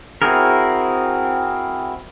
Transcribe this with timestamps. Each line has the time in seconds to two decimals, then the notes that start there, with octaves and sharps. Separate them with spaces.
0.22 C4 E4 F#4 G#4 A#4